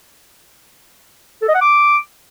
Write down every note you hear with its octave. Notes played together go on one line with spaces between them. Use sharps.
A4
D#5
F#5
D6